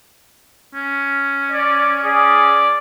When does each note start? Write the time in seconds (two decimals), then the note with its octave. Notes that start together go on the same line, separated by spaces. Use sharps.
0.74 C#4
1.52 D5
2.04 G#4 D5